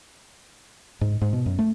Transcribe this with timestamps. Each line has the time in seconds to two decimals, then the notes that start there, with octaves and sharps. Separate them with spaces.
1.01 G#2
1.22 G#2
1.33 B2
1.46 F#2
1.59 A3